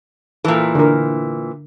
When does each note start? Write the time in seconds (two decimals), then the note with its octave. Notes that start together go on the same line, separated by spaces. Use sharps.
0.45 A#2 E3 A4
0.75 D3 A#4